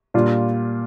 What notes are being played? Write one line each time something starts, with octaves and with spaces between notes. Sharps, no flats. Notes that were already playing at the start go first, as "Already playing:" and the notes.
A#2 G3 D4 F4